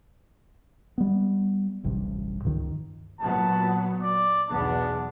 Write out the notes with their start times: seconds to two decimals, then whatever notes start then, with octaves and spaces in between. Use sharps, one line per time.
0.98 G3 B3
1.84 D1 A1 G2 C3
2.44 C#2 G2 D#3
3.20 A#2 F#3 B3 A5
4.03 D5
4.50 B1 E2 B3 D4